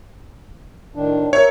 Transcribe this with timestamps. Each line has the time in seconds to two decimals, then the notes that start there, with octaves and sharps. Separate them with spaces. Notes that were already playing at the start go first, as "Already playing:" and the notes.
0.95 A2 D#3 D4
1.33 A#4 C#5 E5